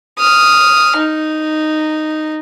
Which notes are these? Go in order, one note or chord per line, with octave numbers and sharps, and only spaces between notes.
D#6 F6
D#4